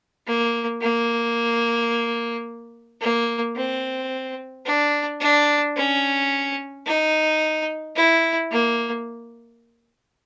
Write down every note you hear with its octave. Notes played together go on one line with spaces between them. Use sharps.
A#3
A#3
A#3
C4
D4
D4
C#4
D#4
E4
A#3